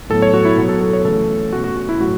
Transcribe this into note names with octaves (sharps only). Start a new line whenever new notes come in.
A2 F#3 B3 A4
C#5
F#4
E4
B2 F#3 B3 F#4
A4
A4
C#5
C#3 E3 A3 A4
B2 A3 C#4 F#4
F#4
F#4
E4
A2 F#3 F#4